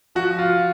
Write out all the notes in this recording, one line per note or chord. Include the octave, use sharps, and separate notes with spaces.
F3 F#4
F4